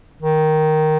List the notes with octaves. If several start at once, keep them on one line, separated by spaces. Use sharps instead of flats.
D#3